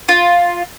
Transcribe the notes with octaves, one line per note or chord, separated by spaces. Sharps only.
F4